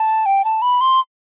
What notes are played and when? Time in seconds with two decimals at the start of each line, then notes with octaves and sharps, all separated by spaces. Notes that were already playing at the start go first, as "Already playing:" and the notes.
Already playing: A5
0.26 G5
0.45 A5
0.62 B5
0.81 C6